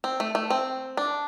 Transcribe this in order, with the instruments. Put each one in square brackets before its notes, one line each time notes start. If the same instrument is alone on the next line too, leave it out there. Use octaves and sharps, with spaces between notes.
[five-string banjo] C4
A3
A3
C4
D4